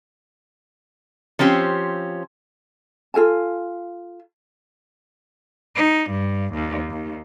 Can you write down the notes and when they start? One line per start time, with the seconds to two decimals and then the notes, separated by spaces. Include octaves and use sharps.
1.39 F3 C4 C#4 G4 C5
3.14 F4 A4 G#5 A5
5.76 D#4
6.11 G2
6.54 D#2
6.90 D#2